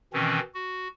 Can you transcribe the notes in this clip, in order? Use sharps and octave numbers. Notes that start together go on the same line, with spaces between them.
B2 D#3 E3 C4 C#4
F#4